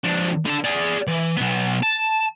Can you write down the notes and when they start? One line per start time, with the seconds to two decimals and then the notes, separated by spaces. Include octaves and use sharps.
0.04 F2 D4
0.45 D3 A5
0.65 G#4 D5
1.08 E3
1.37 B1 B3
1.83 A5